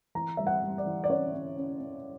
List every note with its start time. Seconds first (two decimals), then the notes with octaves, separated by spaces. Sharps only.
0.15 E3 A#5
0.37 G3 E5
0.47 F#5
0.63 G3
0.78 D5
0.86 E3
1.04 D5
1.09 C#4 C#5
1.34 C#4
1.57 C#4
1.80 C#4